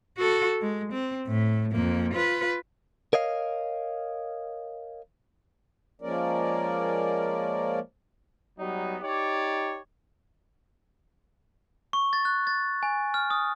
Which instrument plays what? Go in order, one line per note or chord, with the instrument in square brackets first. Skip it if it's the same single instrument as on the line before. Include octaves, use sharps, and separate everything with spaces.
[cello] F#4 A4
G#3
C4
A2
F2 A#3
F4 B4
[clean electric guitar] A#4 C#5 D#5 F5
[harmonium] F3 G#3 A#3 C#4 A#4 D5
[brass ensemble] F#3 G3 B3 D#4
D#4 G4 C#5 D5
[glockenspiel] C#6
A6
F#6
A6
G#5
F6
D#6